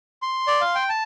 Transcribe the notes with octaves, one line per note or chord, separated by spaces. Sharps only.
C6
D5
F5
G5
A5